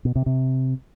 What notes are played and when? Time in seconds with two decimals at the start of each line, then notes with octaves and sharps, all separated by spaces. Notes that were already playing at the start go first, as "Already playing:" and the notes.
0.05 B2
0.16 C3
0.26 C3